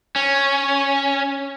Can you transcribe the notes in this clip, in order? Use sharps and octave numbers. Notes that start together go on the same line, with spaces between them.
C#4